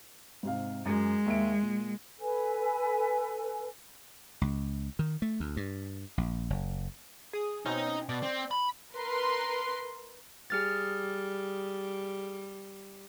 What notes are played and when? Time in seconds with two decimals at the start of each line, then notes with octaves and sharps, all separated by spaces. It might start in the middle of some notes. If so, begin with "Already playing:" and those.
0.43 G#2 C3 F5
0.86 F#2 G#3
1.26 D#2 E5 D7
1.62 A#2
2.20 A4 B4 G#5
4.41 C#2
4.99 D#3
5.22 A3
5.40 D2
5.57 G2
6.18 A#1
6.50 F#1
7.33 G#4 D#6
7.66 B2 C4 C#4 D#4
8.09 B2 D5
8.23 C4
8.51 B5
8.94 A#4 B4 C6
10.50 G3 G#4 F6 A6